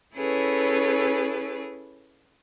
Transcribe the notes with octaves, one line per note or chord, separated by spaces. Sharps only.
C#4 E4 G#4 A4 B4 C#5